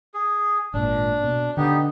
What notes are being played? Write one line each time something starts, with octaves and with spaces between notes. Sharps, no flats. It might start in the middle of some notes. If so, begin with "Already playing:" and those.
G#4
G#1 A#2 D4
B2
D3 B3 D#4 G4